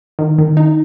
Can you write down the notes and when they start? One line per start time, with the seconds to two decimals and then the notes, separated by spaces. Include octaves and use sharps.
0.19 D#3
0.38 D#3
0.57 D#4